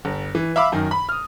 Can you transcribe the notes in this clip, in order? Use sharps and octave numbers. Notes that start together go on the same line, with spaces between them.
G1
E3
E5 F5 B5 D6 E6
F#2 D#3
B5
D#6 F6